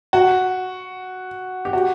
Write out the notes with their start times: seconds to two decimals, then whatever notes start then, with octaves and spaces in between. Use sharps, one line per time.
0.13 F#4
1.65 G4
1.73 F#4